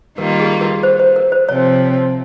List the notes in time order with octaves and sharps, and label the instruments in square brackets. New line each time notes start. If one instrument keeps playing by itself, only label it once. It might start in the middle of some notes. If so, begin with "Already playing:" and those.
[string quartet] D#3 G3 A#3 F4 [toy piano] A#4
[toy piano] G#4
A#4
C5
C5
A#4
C5
[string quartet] C3 F3 C4 [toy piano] C#5